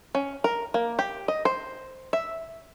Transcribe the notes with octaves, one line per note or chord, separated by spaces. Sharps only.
C#4
A#4
A#3
G4
D#5
C5
E5